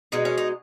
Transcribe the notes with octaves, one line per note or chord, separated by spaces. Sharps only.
B2 G#3 D#4
C#4
D#4